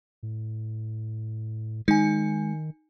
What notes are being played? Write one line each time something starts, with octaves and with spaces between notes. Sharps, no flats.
A2
D#3 G#3 D#4 G#5